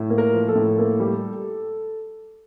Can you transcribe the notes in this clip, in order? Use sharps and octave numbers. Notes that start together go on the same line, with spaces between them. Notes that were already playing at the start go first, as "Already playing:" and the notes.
Already playing: A2
A#3
A#4
F3
A4
A2
A#3
G3